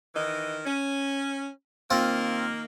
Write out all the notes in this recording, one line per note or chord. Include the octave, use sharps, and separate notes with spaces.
D#3 E3 D#5
C#4
D#3 A#3 C4 F4